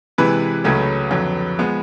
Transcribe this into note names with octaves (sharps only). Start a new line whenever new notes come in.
C3 E3 G#3 B4
C#2 C#3 F#3 A3 C#4
F2 D3 F#3
F3 G#3 B3